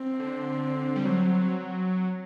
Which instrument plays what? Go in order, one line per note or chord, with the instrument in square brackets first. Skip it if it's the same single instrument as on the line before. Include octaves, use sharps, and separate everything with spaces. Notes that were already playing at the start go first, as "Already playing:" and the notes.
Already playing: [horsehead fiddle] C4
[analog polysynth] D3
G3
F#3